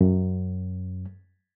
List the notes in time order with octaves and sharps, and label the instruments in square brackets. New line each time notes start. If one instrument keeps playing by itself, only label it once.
[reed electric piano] F#2